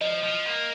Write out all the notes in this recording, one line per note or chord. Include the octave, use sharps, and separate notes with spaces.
F3 D#5
F3
A#3